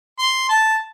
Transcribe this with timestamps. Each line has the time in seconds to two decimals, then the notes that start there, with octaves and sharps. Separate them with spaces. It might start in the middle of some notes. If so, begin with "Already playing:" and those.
0.19 C6
0.49 A5